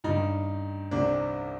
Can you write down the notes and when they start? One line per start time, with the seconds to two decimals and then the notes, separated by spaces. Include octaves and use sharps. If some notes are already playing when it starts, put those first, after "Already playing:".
0.04 G2 D#3 D#4
0.91 C2 C3 D#3 D4